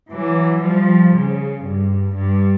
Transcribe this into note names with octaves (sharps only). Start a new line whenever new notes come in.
E3 F#3
F3 G3
C#3
G2
G2